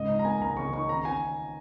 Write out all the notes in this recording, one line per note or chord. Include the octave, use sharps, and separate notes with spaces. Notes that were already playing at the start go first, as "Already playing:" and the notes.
Already playing: G#2 C#3 D#5
D#4
A#5
A#3 G#5
C#2 A#5
C#3 C#6
D#4 C#6
D#3 A#5
C#4 G#5